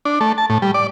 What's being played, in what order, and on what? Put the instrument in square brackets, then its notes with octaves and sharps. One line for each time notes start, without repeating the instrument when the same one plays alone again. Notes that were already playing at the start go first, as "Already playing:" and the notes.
[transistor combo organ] D4
A3
A5
A2
G3
D5